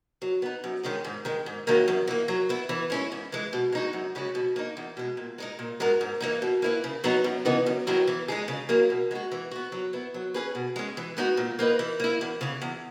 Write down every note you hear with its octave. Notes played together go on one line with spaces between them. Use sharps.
F#3
B3 D#4
F#2
D#3 G#3 C#4 G#4
G#2
D#3 G#3
G#2
D#3 F#3 A#3 E4
F#2
E3 A#3
F#3
B3 E4
E3
G#3 C#4 E4
G#2
E3 G#3
B2
G#3 D#4 F#4
F#2
C#3 G#3 C#4 F#4
B2
A#3 D#4
E2
B2 G#3
A#2
G#3 D#4 A#4
A#2
G#3 B3 F#4 A#4
G#2
E3 A#3 D#4
B2
A#3 E4 B4
C#3
F#3 B3 D#4
F#2
C#3 E3 B3 D#4
F#2
D#3 F#3 B3 E4
E3
G#3 D#4 G#4
C#3
F#3 A#3 E4 G#4
B2
G#3 B3 F#4
E3
B3 F#4
F#3
B3 E4
F#3
C#4 G#4 B4
B2
G#3 C#4
E3
G#3 B3 D#4 F#4
A#2
A#3 D#4 G#4 B4
E3
A#3 E4
E2
C#3 E3
E2